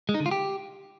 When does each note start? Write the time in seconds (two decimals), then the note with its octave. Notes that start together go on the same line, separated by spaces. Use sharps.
0.09 G#3
0.14 D#4
0.20 D3
0.26 F4
0.31 G4